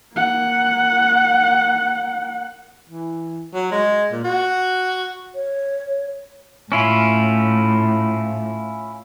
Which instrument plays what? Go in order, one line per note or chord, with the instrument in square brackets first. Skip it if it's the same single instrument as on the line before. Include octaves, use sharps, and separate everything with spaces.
[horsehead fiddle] A#3 F#5
[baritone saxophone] E3
F#3
G#3
A#2
F#4
[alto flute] C#5
[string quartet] A2 [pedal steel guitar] C#4 E4 F4